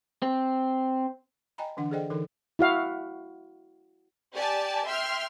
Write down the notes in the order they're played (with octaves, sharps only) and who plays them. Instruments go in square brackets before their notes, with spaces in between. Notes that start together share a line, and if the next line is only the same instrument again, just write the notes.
[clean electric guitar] C4
[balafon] D#5 G5 G#5 A#5 B5
D3 E3 D4 F#5
G#4 A4 C5 D5 D#5 G5
D3 E3 D#4 A4 A#4
[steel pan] E4 F#4 F5
[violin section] G4 D5 G#5 A5
E5 G5 C6 F6